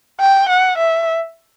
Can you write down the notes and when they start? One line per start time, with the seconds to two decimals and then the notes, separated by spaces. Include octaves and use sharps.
0.20 G5
0.49 F#5
0.78 E5